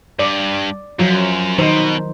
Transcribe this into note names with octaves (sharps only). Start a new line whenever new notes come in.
G2 D5
F#2 F3 F#3 F4
B2 D#3 D#4 C5